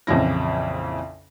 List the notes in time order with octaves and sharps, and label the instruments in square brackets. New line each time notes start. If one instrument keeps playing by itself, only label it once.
[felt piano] A#1 F2 C#3 E3 E4 A#6